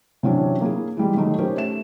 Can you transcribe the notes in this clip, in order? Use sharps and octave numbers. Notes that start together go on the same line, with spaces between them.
C3 E3 F#3 C#4 D4
A#3 E4 G#4
E3 G3 G#3
D#3 F#3 A3 D#4
C#4 D#4 G4 A#4 C5 C#5
A3 E5 E7